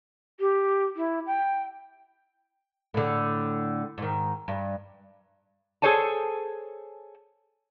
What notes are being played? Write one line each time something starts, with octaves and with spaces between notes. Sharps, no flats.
G4
E4
G5
A2 D3
G#2 D#3
G2
G#4 A4 C5 C#5 G#5 A5